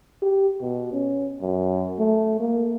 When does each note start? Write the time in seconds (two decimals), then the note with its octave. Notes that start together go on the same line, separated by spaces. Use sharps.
0.22 G4
0.61 B2
0.92 C#4
1.41 F#2
1.99 A3
2.40 A#3